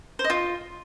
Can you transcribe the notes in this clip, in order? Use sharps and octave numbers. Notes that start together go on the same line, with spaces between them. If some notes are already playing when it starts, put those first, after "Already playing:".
C5
D#5
F4